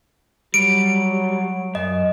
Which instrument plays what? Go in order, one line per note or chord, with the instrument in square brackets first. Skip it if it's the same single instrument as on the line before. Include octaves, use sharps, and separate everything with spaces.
[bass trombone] F#3 [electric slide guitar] G3 [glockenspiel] D7
[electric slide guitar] F#2 [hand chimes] D#5